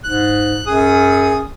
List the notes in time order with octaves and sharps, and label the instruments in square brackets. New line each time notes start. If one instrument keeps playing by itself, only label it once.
[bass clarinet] G#2 [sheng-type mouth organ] F#6
[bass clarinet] F#2 [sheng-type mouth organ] G#4 D#6